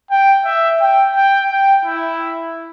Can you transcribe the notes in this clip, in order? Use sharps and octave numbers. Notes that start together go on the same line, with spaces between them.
G5
E5
G5
G5
G5
E4